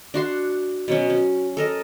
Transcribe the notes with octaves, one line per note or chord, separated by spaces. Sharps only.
D4 F#4 C6
B2 F#3 C#4
C#4
A4 A#4 D#5